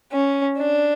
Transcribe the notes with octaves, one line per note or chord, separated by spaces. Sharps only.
C#4
D4